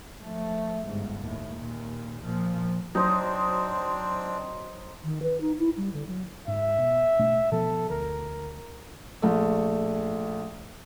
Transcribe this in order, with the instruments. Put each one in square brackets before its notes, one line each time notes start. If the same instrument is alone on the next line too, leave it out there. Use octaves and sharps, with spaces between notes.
[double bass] F3 A3
G1 G#2
D#2 A2
D#2 A#2
A#2 F3
[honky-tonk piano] F#3 [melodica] C4 D4 [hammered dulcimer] D#4 C5 D#5
[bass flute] D#3
B4
D#4
E4
G3
D3
F#3
[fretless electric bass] G#2 [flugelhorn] E5
[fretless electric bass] B2
B2 A3 D4
[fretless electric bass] B2 F3 B3 [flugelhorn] A4
[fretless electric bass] D2 [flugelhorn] A#4
[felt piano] A#1 A3